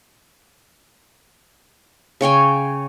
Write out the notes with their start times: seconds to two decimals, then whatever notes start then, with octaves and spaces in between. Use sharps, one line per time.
2.21 C#3 C#5 G5 G#5